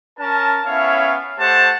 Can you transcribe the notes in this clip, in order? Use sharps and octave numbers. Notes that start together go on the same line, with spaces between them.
C#4 A#4 A5
B3 C#4 E4 C#5 F5
A3 G4 C5 F#5 A5